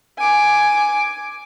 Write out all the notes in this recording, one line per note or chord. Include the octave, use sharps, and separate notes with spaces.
G#5 D6